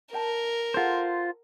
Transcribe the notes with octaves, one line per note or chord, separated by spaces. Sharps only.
A#4 D#5 G5 A5
F4 G#4 A4 C5 F#5